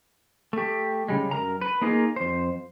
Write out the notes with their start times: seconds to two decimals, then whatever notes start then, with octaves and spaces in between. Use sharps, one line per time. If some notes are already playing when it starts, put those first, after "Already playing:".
0.53 A3 G4
1.08 C#3 G3 G#3
1.31 F#2 A#4 A#5
1.61 B4
1.82 A#3 D#4 F4 G#4 A#4
2.16 F2 C5